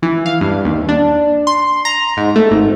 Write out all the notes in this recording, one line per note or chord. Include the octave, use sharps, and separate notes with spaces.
E3
F5
G2
D#2
D4
C6
A#5
G#2
A3
G#1